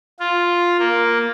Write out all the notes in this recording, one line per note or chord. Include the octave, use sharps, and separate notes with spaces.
F4
A#3